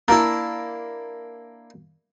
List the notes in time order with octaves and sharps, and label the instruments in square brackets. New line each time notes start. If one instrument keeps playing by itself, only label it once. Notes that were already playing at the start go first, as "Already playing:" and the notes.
[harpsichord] A#3 D4 E4 [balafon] A#5